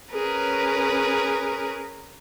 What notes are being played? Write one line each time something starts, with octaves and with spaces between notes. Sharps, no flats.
C#4 G#4 A#4 B4